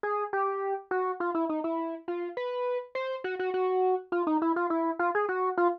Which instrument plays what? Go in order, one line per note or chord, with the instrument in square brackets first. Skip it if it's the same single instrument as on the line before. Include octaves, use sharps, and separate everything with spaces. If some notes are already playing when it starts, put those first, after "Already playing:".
[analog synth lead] G#4
G4
F#4
F4
E4
D#4
E4
F4
B4
C5
F#4
F#4
F#4
F4
D#4
E4
F4
E4
F4
G#4
F#4
F4